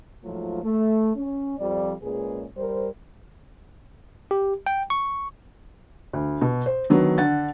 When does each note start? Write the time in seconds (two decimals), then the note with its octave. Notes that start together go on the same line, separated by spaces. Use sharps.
0.24 G#2 F3 F#3 A3 F4
0.63 A3
1.16 C#4
1.58 F2 F3 G3 D5
2.03 A#2 G#3 C#4 G#4 B4
2.57 G3 A#4 C5
4.31 G4
4.66 G5
4.90 C#6
6.13 D2
6.41 B2
6.66 C5
6.90 D3 D#3 F#3 B3
7.18 D3 F#5 A6